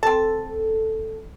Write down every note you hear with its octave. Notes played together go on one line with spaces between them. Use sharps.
C4 A4 A5